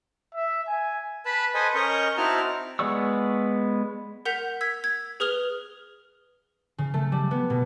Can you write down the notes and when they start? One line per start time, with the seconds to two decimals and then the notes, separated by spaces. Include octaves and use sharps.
0.35 E5
0.68 G#5
1.25 B4 A5 B5
1.54 A4 B4 C5 D#5 G#5
1.75 C#4 A#4 D#5 C#6 G6
2.17 C4 D#4 E4 F#4 A5 F6
2.79 G#3 B3 D5 C#6 E6
4.25 A#4 F#5 G6 B6 F7
4.61 E6 G#6 B6
4.84 G#6
5.20 G#4 B4 D#6 F6 F7 G7
6.78 C#3
6.94 A3
7.12 G3
7.31 B3
7.50 B2